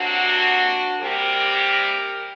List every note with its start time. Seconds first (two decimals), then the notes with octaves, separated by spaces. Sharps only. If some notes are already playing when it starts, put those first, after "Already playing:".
Already playing: C3 F#3 A#3 D4 F#4
1.01 C3 G3 A#3 G4 A#4